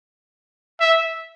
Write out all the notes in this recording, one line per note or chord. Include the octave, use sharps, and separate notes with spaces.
E5